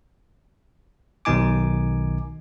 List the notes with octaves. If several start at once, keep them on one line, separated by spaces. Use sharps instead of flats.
B1 B2 D#3 D#4 G#5 D6